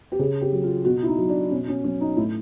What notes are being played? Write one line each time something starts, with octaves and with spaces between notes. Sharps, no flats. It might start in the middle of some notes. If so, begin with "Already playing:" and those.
G4
C#3 G#4
G4
F#3
F4
B2 F#4
E4
D#4
F#3
D4
B2 C#4
C#4
F#3 C#4
D#4
A2 E4